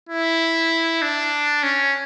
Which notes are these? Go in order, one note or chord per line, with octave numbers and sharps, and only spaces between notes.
E4
D4
C#4